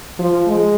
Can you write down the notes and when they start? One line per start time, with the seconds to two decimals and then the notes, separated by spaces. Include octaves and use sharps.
0.19 F3
0.47 G#3